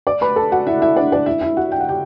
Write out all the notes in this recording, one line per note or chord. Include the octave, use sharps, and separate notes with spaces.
D5 D6
B4 B5
A4 A5
F#4 F#5
E4 E5
E4 E5
D4 D5
D4 D5
E4 E5
E4 E5
F#4 F#5
G5
F#5
G4 G5